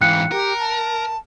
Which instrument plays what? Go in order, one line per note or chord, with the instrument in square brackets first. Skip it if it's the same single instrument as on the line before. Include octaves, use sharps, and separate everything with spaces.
[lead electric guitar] G#2 E3 [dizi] F5 [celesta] G5 F#6 C#7
[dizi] G4 [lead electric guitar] A#4
[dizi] A5